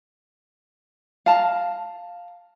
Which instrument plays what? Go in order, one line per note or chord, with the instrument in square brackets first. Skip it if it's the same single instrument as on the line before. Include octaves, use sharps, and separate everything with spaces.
[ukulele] F5 A5 A#5